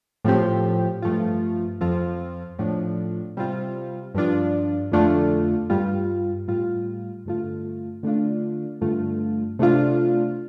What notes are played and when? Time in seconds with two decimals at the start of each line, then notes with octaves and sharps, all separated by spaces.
0.25 A2 F3 C4 G4
1.02 G2 F3 A3 F4
1.81 F2 F3 C4 F4
2.59 A2 F3 D4
3.37 C3 G3 C4 F4
4.15 G2 F3 D4 F4
4.92 F2 D3 A3 D4 F4
5.70 G2 G3 F4
6.48 A2 G3 F4
7.26 G2 D3 A3 F4
8.03 D3 A3 D4 F4
8.81 G2 D3 A3 F4
9.59 C3 A3 D4 F4